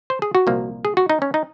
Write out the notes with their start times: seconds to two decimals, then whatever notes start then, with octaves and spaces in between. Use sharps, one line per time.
0.10 C5
0.22 G#4
0.35 F#4
0.47 C2 A#2 F3 A#3
0.85 G#4
0.97 F#4
1.09 D#4
1.22 C#4
1.34 D#4